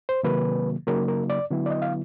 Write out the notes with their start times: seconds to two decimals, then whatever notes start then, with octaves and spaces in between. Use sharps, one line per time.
0.09 C5
0.23 C3 D#3 F#3 A#3 B4
0.87 C#3 F#3 A#3 D#4 A#4
1.08 A#4
1.30 D5
1.51 D3 F#3 B3 E4
1.66 D5
1.70 D#5
1.82 F5